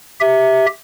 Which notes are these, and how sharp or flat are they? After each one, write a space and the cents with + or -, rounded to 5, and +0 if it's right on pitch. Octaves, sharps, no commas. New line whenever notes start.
G4 +0 E5 -10